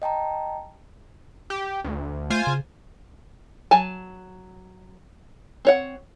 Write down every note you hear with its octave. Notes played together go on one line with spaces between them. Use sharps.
D#5 G5 A5 A#5
G4
D2
A3 F4 C5 G#5
C#3
F#3 G#5 A5
C4 C#5 F#5